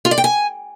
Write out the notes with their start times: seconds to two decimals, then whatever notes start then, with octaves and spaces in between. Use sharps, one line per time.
0.05 F4
0.11 D5
0.18 G5
0.24 G#5